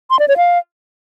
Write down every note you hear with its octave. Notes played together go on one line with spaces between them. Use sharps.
C6
D5
C#5
F5